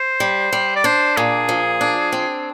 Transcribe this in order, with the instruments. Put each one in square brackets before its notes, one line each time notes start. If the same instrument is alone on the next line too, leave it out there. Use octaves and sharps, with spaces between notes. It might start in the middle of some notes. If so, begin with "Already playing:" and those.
Already playing: [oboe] C5
[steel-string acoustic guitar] G3
G3
[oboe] D5
[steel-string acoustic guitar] D4 [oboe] C5
[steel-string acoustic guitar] A#2 [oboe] G#4
[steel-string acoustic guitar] F3
D4
C4